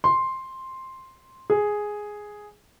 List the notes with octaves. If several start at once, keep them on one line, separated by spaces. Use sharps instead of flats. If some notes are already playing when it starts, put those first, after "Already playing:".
C6
G#4